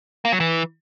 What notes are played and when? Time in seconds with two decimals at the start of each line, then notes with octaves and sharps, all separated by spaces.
0.25 A#3
0.32 F#3
0.40 E3